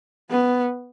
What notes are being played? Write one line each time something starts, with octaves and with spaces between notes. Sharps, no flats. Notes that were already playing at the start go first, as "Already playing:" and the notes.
B3